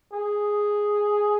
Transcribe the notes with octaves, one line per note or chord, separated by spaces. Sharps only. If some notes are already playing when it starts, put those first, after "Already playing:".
G#4